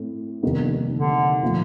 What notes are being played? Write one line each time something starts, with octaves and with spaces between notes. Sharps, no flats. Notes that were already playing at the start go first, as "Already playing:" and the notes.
Already playing: A2 C4
F1 D#2 D#3 G3 B3
D3
A#2 F3 A3